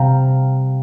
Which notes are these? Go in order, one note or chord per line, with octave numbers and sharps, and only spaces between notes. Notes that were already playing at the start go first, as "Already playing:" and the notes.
Already playing: C3 G3 F5 G5 A#5